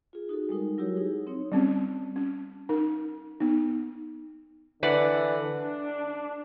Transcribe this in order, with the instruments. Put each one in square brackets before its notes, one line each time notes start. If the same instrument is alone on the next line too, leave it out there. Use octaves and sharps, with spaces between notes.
[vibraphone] F4 G#4
D#4 F#4 G#4 A4
G3 G#3 D#4 A#4
F#3 E4 F#4 G4 A#4 C#5
D#4 G#4
C4 D#4 C#5
[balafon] G3 C4 C#4
C#4
D#4 A#4
B3 D#4
[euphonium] D3 [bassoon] E3 [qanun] B4 D5 F#5
[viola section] D4